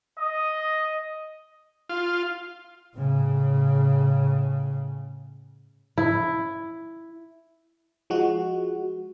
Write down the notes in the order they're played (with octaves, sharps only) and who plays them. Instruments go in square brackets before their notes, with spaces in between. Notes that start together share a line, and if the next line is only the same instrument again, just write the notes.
[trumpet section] D#5
[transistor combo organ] F4
[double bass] A2 C#3
[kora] E4
[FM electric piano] F3 G#3 F#4